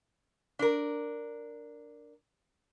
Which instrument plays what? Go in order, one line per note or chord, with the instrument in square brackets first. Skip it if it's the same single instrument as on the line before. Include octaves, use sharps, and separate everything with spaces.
[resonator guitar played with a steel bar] D4 A#4